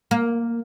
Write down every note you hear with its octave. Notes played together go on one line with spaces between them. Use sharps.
A#3